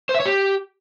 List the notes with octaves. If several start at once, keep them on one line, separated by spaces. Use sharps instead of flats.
C5
E5
C#5
G4